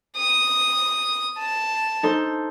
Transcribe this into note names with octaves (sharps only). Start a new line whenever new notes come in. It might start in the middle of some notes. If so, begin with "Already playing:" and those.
D#6
A5
D#4 A4 C5